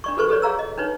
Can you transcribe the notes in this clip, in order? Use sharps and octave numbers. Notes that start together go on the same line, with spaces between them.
D4 D5 C#6
F#4 G#4 A4 B4 C5 C#6
G4 A4 B4 C#5 D5
G#4 C#5 F5 A#5 E6
D#5
D4 D#4 B4 C#5